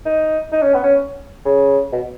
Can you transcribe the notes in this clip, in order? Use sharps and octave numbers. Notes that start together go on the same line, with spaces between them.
D#4
D#4
C#4
B3
C#4
C#3
B2